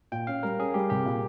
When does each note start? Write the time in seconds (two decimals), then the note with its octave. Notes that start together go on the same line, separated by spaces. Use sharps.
0.12 A#2 G5
0.27 C#4 F5
0.43 G3 A#4
0.59 C#4 G#4
0.74 G3 G4
0.90 C2 G4
1.06 A#2